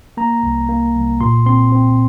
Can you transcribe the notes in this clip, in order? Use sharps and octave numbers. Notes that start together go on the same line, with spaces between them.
A#3 A#5
C2
A#3
C2
A#2 C6
C4 C6
C4